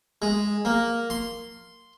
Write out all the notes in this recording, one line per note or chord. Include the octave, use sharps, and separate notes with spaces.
G#3
A#3
C6